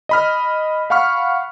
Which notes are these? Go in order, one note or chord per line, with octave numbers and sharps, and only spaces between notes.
D#5 B5 F6
F5 F#5 B5 C#6 F6